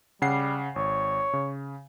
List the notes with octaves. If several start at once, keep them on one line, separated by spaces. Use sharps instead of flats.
C#3 G3 F#5 C7
G#1 C#5
C#3